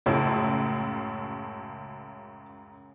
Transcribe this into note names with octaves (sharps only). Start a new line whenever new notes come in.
C#2 F#2 A2 C#3